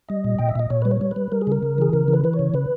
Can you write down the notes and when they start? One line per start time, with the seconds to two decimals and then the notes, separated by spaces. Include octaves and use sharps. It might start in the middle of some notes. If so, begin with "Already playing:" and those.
0.09 G3 D#5
0.24 A#2
0.39 A#2 G5
0.49 E5
0.56 A#2 D#5
0.70 A#2 C#5
0.82 G3 B4
0.91 C#5
1.01 G3
1.11 G3 B4
1.32 G3 A#4
1.41 G#4
1.47 C#3 A#4
1.63 C#3
1.78 E3 G#4
1.93 C#3 A#4
2.08 E3
2.13 B4
2.24 E3 B4
2.33 C#5
2.39 C#3
2.54 C#3 B4